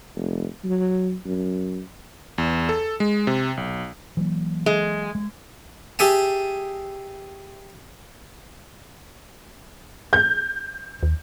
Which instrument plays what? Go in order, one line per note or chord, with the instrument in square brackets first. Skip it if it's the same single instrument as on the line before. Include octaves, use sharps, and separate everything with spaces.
[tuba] F1
F#3
F#2
[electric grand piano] E2
A4
G#3
C3
B1
[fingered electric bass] E3 F#3 A#3
[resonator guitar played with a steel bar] G#3
[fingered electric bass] G#3
[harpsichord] G4 G#4 E5 G#5 A5
[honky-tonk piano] G6
[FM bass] D#2